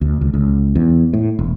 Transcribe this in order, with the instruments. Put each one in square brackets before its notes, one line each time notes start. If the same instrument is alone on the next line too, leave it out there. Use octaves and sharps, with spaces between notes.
[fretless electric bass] D2
C#2
C#2
E2
A2
E1